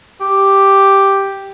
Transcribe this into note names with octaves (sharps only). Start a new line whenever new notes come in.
G4